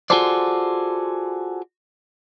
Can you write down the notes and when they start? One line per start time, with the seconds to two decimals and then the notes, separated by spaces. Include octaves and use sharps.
0.10 F4 F#4 G#4 A4 C5 D5